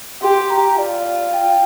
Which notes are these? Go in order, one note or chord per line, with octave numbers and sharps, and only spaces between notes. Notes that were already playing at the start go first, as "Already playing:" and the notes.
G4 C6
A#5
F4 D5
G5